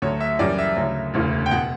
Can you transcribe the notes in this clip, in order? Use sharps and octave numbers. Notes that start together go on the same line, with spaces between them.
D2 D3 F#3 C#5
E5
F#1 F#2 E3 G3 D5
E5
D2 C#3 F#3
E1 D2 C#3 E3
G5
B2 F#5